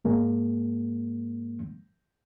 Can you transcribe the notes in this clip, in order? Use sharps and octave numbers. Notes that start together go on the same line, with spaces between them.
G#2 G#3 A#3